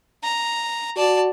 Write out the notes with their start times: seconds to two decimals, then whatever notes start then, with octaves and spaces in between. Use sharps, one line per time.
0.23 A#5
0.97 F#4 D5 A5